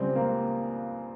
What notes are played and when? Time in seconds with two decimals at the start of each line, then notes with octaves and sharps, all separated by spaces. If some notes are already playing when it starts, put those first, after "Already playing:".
Already playing: C#2 C#3 G3 C4
0.16 A#3